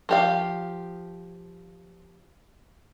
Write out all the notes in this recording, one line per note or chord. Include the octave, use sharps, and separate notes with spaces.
F3 G4 F5